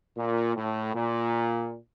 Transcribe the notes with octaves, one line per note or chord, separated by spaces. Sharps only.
A#2
A2
A#2